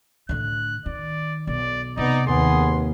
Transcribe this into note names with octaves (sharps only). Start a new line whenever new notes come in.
A2 D3 F#6
D#3 D5
B1 D5
C3 B3 D#4 D5
D#2 B3 G#4 C6